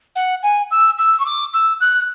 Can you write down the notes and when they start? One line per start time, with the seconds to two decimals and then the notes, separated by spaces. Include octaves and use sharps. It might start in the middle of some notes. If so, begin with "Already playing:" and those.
0.15 F#5
0.42 G#5
0.71 E6
0.98 E6
1.19 C#6
1.25 D6
1.53 E6
1.80 F#6